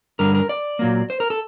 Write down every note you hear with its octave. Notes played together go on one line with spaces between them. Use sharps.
G2 D3 G3 A#4
A#4
D5
A#2 F#3 A#3
C5
A#4
A4